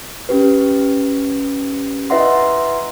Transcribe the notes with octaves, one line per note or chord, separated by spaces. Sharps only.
C#4 G4 B4
E4 B4 D#5 E5 F#5 C6